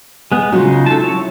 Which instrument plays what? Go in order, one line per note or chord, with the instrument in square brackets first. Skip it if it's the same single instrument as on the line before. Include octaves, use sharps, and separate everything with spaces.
[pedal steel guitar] G#3 B3
[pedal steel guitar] C#3 G#3 D#4 [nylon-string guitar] F#3 F4
[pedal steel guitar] A4 A5
E4 C#5